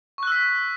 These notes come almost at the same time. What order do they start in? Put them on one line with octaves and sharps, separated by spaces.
C#6 F#6 E6 B6